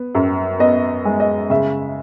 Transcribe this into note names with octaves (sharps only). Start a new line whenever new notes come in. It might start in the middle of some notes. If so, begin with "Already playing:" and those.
Already playing: B3
F#2
B3 D#5
G#3
D#5
C#3 E5